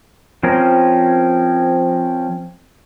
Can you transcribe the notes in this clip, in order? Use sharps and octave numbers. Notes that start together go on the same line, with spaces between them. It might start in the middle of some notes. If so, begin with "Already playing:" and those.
F3 C4 C#4 A#4